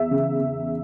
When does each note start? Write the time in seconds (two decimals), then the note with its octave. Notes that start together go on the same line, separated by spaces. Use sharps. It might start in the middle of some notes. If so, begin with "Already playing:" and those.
Already playing: E2 E5
0.11 C#3
0.40 C#3